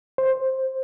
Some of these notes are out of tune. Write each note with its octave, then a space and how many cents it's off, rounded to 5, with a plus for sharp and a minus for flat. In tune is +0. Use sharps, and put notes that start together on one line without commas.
C5 +10